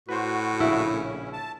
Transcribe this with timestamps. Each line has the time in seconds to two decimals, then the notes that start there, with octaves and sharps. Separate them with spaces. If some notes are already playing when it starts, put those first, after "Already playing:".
0.09 A2 F#4 B4 C5
0.60 A#1 C#3 E4
0.92 C#4
1.33 A5